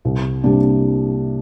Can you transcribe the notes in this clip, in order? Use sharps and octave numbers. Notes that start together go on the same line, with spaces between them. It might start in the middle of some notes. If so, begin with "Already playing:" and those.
C2
C3 G3 A#3 D4